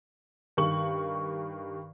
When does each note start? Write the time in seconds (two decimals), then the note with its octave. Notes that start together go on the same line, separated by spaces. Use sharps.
0.57 G2 D#3 C#6 F#7